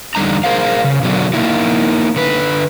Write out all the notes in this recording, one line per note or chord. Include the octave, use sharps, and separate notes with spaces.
E2 D3 G3 D#4 A#5
G#4 A#4 C5 F5
C#3
B2 D3 F#3 A3 D4 F#4
A#3 D#4 E4
D3 B4